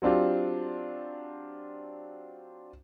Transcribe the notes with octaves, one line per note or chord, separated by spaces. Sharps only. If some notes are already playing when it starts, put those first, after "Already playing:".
F#3 C4 D4 F4 G4